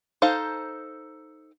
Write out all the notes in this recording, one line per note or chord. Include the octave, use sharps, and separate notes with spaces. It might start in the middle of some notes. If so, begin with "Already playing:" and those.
D#4 A4 C5 F5